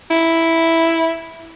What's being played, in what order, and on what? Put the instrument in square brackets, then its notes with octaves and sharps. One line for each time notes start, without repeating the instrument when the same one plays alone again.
[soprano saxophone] E4